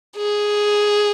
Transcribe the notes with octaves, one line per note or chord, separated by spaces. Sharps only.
G#4